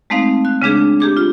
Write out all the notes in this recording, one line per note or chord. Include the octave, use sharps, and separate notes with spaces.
G#3 A3 C4 D#4 F5
F#6
C#3 G#3 D4 G#4
G4 G#4 D6
F4